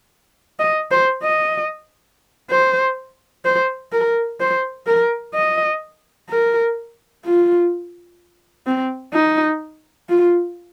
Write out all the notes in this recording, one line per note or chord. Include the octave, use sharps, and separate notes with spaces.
D#5
C5
D#5
C5
C5
A#4
C5
A#4
D#5
A#4
F4
C4
D#4
F4